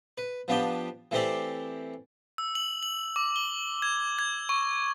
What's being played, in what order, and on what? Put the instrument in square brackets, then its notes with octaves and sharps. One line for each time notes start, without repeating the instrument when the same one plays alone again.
[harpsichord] B4
F3 B3 D4 G4 G5
E3 A3 C4 G4 C5 D5
[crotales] E6
F#7
F#7
D6
G7
G#6
G#6
C#6